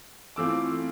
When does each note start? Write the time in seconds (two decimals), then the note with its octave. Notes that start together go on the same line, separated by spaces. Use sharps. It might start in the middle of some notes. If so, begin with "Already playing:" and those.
0.36 E3 A3 C4 F4 D6 E6